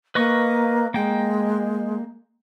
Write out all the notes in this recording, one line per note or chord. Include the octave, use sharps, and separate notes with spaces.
A#3 B4 D#5 C#6
G#3 A#3 G5